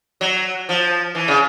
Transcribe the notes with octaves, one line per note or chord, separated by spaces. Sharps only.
F#3
F3
E3
C#3